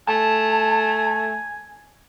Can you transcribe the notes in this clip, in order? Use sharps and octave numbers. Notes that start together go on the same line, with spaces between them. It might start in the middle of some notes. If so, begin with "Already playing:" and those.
A3 G#5 A5